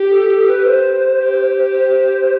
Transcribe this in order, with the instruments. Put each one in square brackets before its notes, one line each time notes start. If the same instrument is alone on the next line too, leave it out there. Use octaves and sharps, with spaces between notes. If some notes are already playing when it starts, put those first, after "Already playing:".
Already playing: [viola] G4
[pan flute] A4
A4
B4
C5
[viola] G4
[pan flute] C5